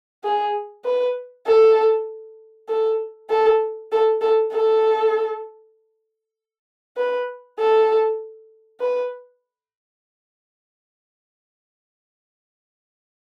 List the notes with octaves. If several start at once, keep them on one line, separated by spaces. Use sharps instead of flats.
G#4
B4
A4
A4
A4
A4
A4
A4
B4
A4
B4